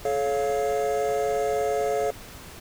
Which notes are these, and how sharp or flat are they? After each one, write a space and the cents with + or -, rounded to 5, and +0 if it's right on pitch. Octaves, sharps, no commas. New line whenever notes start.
A4 -40 C#5 +0 F5 +0